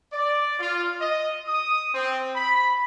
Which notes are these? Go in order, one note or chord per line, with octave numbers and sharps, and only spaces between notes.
D5
F4
D#5
D#6
C4
B5